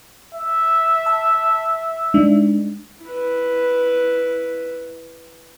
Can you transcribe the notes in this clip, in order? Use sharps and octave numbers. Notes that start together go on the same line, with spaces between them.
E5
A5
G#3 D4 D#4
E4 B4